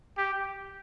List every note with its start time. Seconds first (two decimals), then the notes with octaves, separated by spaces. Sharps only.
0.18 G4